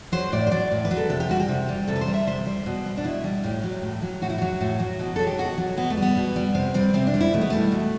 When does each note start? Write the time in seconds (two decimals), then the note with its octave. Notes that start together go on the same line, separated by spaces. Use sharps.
0.12 F#3 C5
0.32 A2 D5
0.47 C5
0.51 F#3 D5
0.71 A2
0.85 B4
0.91 F#3
0.97 A4
1.10 C3 A4
1.20 G4
1.29 G3 F#4
1.40 G4
1.48 C3
1.69 G3
1.88 C3 A4
1.96 B4
2.01 C5
2.07 G3
2.14 E5
2.27 C3 C5
2.46 G3
2.66 B2
2.86 G3
2.97 D4
3.04 B2 E4
3.24 G3
3.44 A2 G4
3.63 F#3
3.82 A2
4.02 F#3
4.21 A2 F#4
4.30 E4
4.38 F#3 F#4
4.60 A2
4.80 F#3
4.99 B2
5.16 F#3 A4
5.27 G4
5.38 B2 F#4
5.58 F#3
5.77 B2 B3
5.90 A3
5.97 G3
6.02 B3
6.17 B2
6.36 G3
6.55 C3 C4
6.74 G3 C4
6.94 C3 C4
7.07 D4
7.14 G3
7.20 E4
7.33 B2 A3
7.41 B3
7.50 G3 A3
7.72 B2